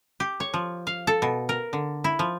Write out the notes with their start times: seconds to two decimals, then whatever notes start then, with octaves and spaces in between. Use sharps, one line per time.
0.20 G4
0.40 C#5
0.54 F3
0.87 F5
1.07 A4
1.22 B2
1.49 A#4
1.73 D3
2.04 E4
2.19 F3